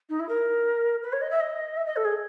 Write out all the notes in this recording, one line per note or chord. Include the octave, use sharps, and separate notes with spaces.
D#4
E4
A#4
B4
C#5
D#5
E5
D#5
E5
D#5
A4
G#4